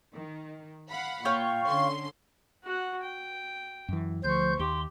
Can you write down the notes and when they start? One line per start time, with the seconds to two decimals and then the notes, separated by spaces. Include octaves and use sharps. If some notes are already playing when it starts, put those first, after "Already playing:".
0.13 D#3
0.89 F5 F#5 B5
1.25 A#2 F4 C#5 G5 C#6
1.66 D3 C#4 C6
2.64 F#4 F#5
3.03 G5
3.89 F#2 E3
4.24 D2 F3 C5 C6 C#6 G6
4.59 D#2 G4 C6